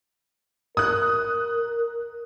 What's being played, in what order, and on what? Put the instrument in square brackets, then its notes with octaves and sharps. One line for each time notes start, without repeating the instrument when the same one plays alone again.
[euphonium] A#4 [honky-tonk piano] D#6 F#6